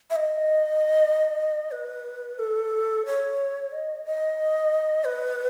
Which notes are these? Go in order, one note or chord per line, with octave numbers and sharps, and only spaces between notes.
E5
D#5
B4
A4
C#5
D#5
D#5
B4